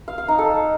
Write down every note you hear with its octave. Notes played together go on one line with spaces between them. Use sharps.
F5
F5
D#4
A4